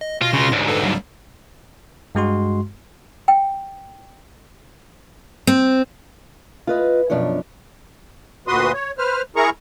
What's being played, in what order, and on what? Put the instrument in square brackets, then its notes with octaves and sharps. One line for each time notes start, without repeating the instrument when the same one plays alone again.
[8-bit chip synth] D#5
[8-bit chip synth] B2 C6 A#6 [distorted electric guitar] F4
[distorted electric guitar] C#3 F4
D2 G#2
[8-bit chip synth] A4 B4
F#3 G3
[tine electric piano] G2 G#3 F#4 C6
[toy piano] G5
[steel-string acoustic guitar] C4
F4 B4 D#5
F#2 B2 F3 D4 C#5
[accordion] D2 A#2 F#4 B4 C6 D#6
C#5
B4 C5 F6
E4 G#4 A#4 A#5 C#6